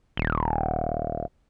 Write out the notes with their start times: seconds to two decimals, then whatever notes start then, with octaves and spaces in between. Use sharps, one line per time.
0.17 D#1